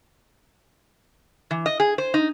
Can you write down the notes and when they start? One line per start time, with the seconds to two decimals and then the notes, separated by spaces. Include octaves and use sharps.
1.51 E3
1.66 D#5
1.80 G#4
1.98 C5
2.14 D#4